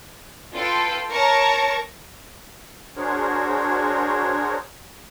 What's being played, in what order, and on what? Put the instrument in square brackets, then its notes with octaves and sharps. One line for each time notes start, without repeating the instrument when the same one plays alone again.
[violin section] F4 A4 B4 G5
A#4 C#5 A5 A#5 C#6
[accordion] D4 F#4 G#4 A#4 C5 C#5